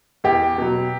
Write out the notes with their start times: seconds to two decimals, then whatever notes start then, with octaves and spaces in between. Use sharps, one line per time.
0.24 E2 G4
0.58 B2 F#3